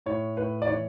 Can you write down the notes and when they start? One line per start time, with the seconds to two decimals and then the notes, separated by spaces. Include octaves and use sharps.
0.06 A2 C#5
0.37 A2 B4
0.62 D5
0.68 E3 C#5